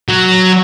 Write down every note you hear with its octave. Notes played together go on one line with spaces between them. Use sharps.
F#3